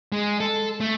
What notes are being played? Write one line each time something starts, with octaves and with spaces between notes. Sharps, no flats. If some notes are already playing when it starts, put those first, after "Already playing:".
G#3
A4
A3